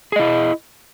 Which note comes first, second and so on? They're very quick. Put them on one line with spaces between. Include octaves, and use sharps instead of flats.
G#4 D#5 E4